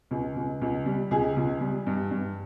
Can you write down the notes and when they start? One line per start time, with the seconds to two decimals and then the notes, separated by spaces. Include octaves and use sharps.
0.11 C#2
0.36 C#2
0.62 C#2
0.86 G3
1.11 C#2 G#4
1.37 C#2
1.61 G3
1.87 G2
2.11 G2